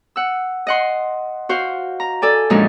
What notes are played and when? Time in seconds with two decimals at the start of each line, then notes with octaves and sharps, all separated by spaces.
0.16 F#5 E6
0.67 D#5 F#5 C6
1.49 F#4 C5 F5
2.00 A#5
2.22 A4 D5 G#5
2.50 F#2 A#2 F3 G#3 D4 D#4